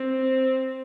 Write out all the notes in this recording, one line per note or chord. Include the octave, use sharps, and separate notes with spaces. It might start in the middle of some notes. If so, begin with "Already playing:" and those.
Already playing: C4